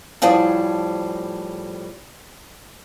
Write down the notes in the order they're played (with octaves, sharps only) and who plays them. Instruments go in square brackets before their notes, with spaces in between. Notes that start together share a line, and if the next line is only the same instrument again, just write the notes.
[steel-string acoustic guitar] A2 F3 G3 G#4 A5